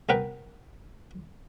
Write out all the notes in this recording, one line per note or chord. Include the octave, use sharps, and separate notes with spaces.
C2 B3 A#4 B4 G5